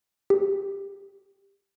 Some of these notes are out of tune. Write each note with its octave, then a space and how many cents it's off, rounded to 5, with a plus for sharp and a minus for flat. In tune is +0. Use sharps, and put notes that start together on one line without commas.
G4 +10